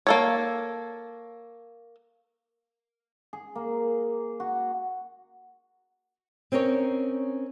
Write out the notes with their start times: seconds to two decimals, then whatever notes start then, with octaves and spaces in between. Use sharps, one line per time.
0.07 A#3 A4 C#5
3.33 G#4
3.55 A#3
4.40 F#4
6.52 C4 C#4 D#4 A#4 C#5